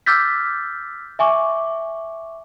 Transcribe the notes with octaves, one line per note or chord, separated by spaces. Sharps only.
D6 E6 F6 G6 A6 B6
E5 G#5 C#6 D6